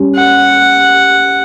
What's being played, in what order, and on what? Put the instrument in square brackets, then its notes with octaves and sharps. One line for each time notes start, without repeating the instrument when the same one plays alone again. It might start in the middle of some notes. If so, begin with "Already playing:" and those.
Already playing: [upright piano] G3 C#4
[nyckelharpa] F#5